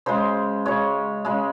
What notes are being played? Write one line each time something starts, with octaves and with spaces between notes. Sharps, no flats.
C#3 G#3 C5
C#3 G#3 C#5
C#3 G#3